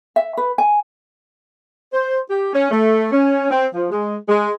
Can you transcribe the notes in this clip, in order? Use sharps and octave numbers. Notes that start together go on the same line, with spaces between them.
E5
B4
G#5
C5
G4
C#4
A3
C#4
C4
F3
G#3
G#3